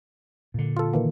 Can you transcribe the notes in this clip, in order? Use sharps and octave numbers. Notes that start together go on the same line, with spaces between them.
A#2 D3
F4 A4
D#3 E3 A#3